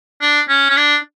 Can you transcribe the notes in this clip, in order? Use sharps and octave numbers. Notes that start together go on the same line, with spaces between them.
D4
C#4
C#4
D4